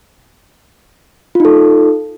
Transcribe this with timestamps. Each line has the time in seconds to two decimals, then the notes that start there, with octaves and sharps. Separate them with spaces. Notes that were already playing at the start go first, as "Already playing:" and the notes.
1.35 F4
1.40 D#4
1.45 A4